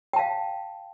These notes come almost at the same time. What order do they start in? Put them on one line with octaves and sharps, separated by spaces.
G5 A5 F5